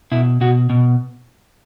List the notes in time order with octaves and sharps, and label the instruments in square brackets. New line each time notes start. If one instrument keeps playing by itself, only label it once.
[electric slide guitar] B2 E4
B2 F#4
B2